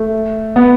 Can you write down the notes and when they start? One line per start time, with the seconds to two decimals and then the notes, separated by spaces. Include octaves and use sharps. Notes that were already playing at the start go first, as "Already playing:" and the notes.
Already playing: A3
0.56 B3